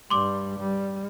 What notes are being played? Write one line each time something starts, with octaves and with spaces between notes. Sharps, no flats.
G2 G3 C6 D6
G3